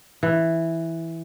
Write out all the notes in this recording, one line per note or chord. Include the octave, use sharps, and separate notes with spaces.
E3